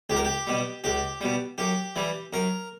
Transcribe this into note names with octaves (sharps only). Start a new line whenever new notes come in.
C#2 G4
A#4
G4
B2 G3
C#2 G4
B2 G3
F#2 G4
E3 G3
F#2 A#4